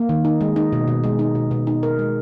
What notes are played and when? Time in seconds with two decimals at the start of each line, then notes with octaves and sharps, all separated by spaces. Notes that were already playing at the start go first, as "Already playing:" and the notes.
Already playing: A#3
0.09 D#3
0.25 D#4
0.41 G#3
0.56 D#4
0.73 B2
0.88 B2
1.04 G#3
1.19 D#4
1.35 B2
1.51 B2
1.67 D#4
1.83 A#4
1.99 G#3